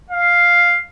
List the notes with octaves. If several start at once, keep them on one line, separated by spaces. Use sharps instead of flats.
F5